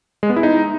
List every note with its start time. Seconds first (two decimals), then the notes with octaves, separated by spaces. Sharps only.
0.23 G#3
0.30 B3
0.36 E4
0.43 D#4